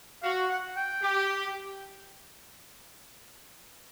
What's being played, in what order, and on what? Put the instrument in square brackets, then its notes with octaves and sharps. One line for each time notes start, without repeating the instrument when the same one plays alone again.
[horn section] F#4 [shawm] F5
[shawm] F#5
G5
[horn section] G4